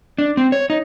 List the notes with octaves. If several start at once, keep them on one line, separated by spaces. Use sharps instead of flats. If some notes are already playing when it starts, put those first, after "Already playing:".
D4
C4
C#5
D#4